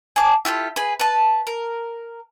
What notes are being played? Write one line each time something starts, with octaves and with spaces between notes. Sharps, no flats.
G#4 A5 D6
E4 F4 G4 A4
G#4 B4
B4 A5
A#4